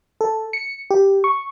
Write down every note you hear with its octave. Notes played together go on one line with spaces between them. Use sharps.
A4
C#7
G4
C#6